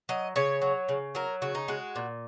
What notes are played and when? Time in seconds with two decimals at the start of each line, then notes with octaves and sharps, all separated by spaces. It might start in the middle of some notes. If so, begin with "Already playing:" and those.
0.09 F#3 D#5
0.36 C#3 C#5
0.61 F#3
0.89 C#3
1.15 F#3 A#4
1.42 C#3 F#4
1.55 D#4
1.68 G#3 F#4
1.95 A#2